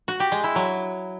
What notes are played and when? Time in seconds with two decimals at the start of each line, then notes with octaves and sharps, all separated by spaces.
0.08 F#4
0.20 G4
0.32 G#3
0.44 E4
0.56 F#3